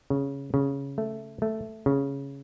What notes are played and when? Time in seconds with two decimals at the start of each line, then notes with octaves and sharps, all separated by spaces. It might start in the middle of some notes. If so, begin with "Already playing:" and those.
0.10 C#3
0.54 C#3
0.98 A3
1.42 A3
1.86 C#3